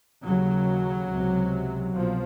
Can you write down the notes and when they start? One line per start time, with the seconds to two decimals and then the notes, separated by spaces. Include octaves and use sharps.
0.24 D#2 C#3 F#3
1.09 C#2 C3
1.94 C2 B2 F3